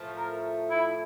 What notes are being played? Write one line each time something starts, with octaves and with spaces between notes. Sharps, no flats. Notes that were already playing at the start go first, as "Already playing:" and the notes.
Already playing: A2 F3 A3
A#4
E4